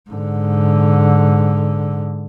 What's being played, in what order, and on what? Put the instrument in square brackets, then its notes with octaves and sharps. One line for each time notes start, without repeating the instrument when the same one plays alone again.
[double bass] G#2 D3